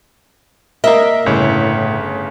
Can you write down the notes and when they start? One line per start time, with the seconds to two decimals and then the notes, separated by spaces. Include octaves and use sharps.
0.84 A#3 A#4 D#5 E5
1.26 G1 A2 C#3 C#5